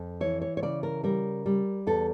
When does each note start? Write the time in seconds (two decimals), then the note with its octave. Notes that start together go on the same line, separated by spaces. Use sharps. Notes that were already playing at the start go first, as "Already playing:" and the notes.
Already playing: F2
0.21 E3 C#5
0.42 C#5
0.57 C#5
0.63 C#3 D5
0.83 A#4
1.04 G3 A#4
1.46 G3
1.87 E2 A4